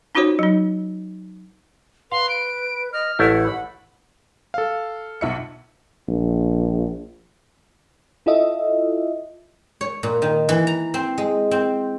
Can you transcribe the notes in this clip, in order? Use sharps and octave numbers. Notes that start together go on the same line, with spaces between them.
C#4 D#4 F4 F#4 C5 C#5
F#3 D#4
B4 F5 C6
D7
D#5 F6
A1 A3 E4 F#5
B5
A4 F5
B1 E5 C#7
A#1
E4 F4 A4 D#5 E5
C#5
A#2
D#3
E3
A#5
C4
G#3
C4